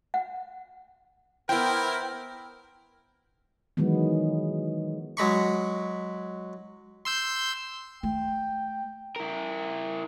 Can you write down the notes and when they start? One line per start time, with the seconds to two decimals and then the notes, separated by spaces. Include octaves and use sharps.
0.14 F#5
1.49 B3 E4 A#4 C5 G5
3.77 D#3 E3 F#3 G#3 B3
5.17 F#3 G#3 B5 C#6
7.05 C6 E6 G6
8.03 A3 G5
9.16 E4 A#4